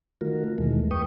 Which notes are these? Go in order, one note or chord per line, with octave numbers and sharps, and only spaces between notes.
D#3 A3 F4 F#4 A#4
D#2 B2 D#3 E3 G#3 A3
F2 B4 G5 C#6 D#6